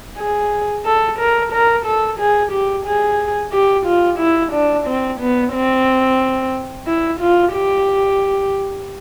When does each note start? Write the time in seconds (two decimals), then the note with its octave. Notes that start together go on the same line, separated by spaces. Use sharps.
0.18 G#4
0.85 A4
1.19 A#4
1.53 A#4
1.85 A4
2.19 G#4
2.52 G4
2.86 G#4
3.53 G4
3.86 F4
4.19 E4
4.52 D4
4.86 C4
5.20 B3
5.53 C4
6.87 E4
7.20 F4
7.54 G4